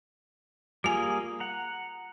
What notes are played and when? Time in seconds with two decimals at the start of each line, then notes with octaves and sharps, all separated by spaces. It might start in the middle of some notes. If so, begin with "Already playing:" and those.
0.84 G3 A#3 F4 G#4 G#5
1.40 F#5 A#5